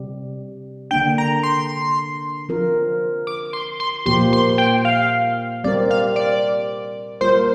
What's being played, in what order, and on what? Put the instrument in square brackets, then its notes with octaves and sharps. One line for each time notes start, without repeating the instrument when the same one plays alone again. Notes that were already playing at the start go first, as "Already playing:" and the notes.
Already playing: [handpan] C3 G3
[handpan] D3 A#3 D4 [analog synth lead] G5
[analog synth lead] A#5
C6
[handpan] F3 C4 F4 A#4
[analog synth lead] D6
C6
C6
[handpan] A#2 F3 A#3 G4 [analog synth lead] C6
[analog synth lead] C6
G5
F5
[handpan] G3 C4 A#4 [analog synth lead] D5
[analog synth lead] F5
D5
[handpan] G3 A#3 F4 A#4 [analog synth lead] C5